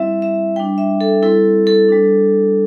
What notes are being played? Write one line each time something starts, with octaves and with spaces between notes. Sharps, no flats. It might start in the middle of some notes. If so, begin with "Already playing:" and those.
Already playing: G3 C4 E4 E5
E5
G3 D4 G5
E5
A4
G3 C4 E4 A4
A4
G3 D4